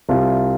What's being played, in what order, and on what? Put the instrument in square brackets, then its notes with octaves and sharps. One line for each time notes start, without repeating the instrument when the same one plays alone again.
[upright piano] C2 C3 G3 F4